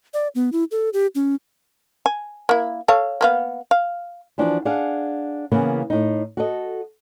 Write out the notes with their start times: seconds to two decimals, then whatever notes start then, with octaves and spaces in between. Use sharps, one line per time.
0.14 D5
0.35 B3
0.52 E4
0.71 A4
0.93 G4
1.15 C#4
2.06 G#5
2.49 A#3 E4
2.88 A4 C#5 F5
3.21 A#3 B3 F5
3.71 F5
4.38 E3 F3 D4 F#4
4.65 D4 G#4 F5 F#5
5.52 C#3 E3 A#3 B3 E4
5.90 A2 D#4
6.37 F#4 A4 D#5